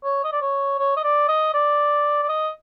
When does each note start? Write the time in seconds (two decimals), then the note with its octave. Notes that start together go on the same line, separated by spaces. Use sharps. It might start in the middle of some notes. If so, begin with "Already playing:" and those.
0.04 C#5
0.24 D#5
0.32 D5
0.41 C#5
0.79 C#5
0.97 D#5
1.04 D5
1.29 D#5
1.54 D5
2.23 D5
2.29 D#5